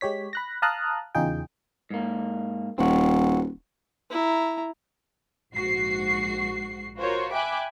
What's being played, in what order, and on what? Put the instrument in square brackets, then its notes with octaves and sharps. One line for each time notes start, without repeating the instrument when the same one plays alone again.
[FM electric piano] G#3 G4 C#5 B6
B5 F#6 A#6
F5 A5 A#5 D#6 F6 F#6
E2 C#3 D#4 F4 G#4 G5
[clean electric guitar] G#2 A#3
[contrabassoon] D#1 [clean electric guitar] C4 F#4
[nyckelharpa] E4 A#5
[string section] A#1 G#2 F#4 C7
F4 F#4 A#4 C5 C#5
E5 G5 G#5 B5 D6 F#6